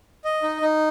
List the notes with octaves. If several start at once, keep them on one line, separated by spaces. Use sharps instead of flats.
D#5
D#4
D#4